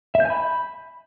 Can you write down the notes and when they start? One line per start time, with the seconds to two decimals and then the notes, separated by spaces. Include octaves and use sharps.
0.15 E5
0.20 G6
0.25 G#5
0.30 B5